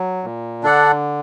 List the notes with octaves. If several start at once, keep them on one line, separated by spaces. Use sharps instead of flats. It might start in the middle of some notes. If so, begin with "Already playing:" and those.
Already playing: F#3
A#2
D3 D4 A4 D5 F#5